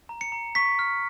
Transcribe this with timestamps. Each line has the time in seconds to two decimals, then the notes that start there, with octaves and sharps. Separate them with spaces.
0.09 A#5
0.21 C#7
0.32 A#5
0.55 C#6 B6
0.79 F6